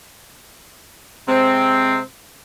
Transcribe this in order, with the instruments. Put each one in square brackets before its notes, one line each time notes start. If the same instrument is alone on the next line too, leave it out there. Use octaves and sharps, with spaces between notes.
[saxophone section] C3 G#3 C4